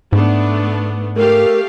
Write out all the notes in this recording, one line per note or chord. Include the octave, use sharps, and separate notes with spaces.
G#2 A3 B3 D4
A3 G4 A#4 F5